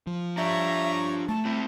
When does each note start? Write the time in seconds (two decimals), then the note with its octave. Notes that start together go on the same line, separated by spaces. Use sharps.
0.07 F3
0.37 D4 G4 C#5 D5 E5 A#5
1.29 A3 A5
1.45 C4 E4